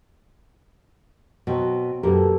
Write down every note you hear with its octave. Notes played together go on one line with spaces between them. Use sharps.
B2 F#3 C4 F#4
F#2 B2 A#3 G4 A4